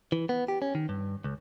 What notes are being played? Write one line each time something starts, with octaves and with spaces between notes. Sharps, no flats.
E3
B3
G4
C#4
D#3
G2
C#2